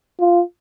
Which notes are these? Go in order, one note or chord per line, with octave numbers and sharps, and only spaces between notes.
F4